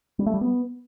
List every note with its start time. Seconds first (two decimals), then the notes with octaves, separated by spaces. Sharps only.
0.19 G3
0.26 A3
0.34 G3
0.41 B3